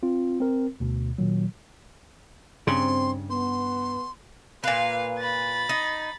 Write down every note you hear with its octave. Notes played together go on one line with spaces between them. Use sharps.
C4 F4
C4 A#4
D2 B2
A#2 D#3 F#3
G2 C#3 C4 C6
B3 C6
A#2 B4 F5
B5 A6
D#4